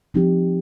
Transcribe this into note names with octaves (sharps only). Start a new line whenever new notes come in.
F3 C4 D#4 G4